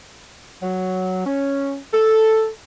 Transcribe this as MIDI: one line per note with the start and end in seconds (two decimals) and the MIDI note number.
0.62 1.23 54
1.26 1.77 61
1.94 2.48 69